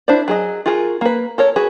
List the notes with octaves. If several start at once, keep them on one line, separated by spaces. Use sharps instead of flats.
D4 E4 C5 D5
F#3 G#4 D#5
F4 F#4 G#4 A#4
A#3 B4
A4 A#4 C#5
F#4 G#4 B4